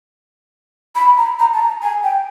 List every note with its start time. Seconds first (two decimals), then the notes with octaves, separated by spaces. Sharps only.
0.95 B5
1.17 A#5
1.39 A#5
1.53 A5
1.60 A#5
1.82 G#5
2.03 G5